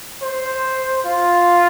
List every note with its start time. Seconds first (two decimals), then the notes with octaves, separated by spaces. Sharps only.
0.22 C5
1.06 F4